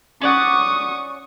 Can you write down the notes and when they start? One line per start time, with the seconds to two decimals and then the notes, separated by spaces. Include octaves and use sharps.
0.21 C#4 D5 F#5 C#6 D#6